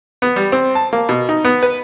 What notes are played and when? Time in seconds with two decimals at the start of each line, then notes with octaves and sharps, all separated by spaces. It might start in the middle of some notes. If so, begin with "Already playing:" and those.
0.22 B3
0.36 G3
0.52 C4
0.75 A5
0.93 A#3
1.09 B2
1.29 D#4
1.45 B3
1.63 B4